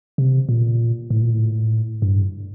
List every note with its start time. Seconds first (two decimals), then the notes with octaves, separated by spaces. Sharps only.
0.18 C3
0.49 A#2
1.10 A2
1.21 A#2
1.32 A2
2.02 G2